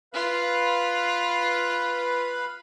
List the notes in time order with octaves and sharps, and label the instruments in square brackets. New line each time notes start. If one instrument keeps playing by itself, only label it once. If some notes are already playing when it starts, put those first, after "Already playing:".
[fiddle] F4 [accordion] B4 F5 B5